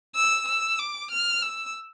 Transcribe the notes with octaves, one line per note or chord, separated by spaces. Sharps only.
E6
E6
D6
F6
E6